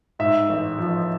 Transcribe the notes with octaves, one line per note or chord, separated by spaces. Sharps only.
G#2 E5
A1
F3